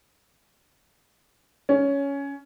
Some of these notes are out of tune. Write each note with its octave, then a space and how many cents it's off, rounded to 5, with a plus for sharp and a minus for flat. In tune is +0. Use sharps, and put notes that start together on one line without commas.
C#4 +10